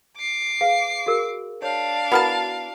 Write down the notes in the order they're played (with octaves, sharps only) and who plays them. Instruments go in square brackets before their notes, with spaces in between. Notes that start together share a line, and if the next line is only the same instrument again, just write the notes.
[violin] D6 C7
[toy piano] G#4 B4 F5
F#4 G#4 A#4
[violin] D4 F5 [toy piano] C#5
[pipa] B3 A#4 A5 [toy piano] E4 F#4 B5